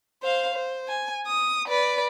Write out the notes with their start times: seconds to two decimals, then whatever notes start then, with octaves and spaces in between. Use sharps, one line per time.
0.23 C5 F5
0.54 C5
0.88 G#5
1.27 D#6
1.68 B4 D5